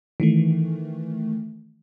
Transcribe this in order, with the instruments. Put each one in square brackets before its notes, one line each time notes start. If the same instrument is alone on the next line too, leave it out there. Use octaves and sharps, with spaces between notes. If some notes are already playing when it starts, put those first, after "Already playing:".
[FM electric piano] D#3 E3 A3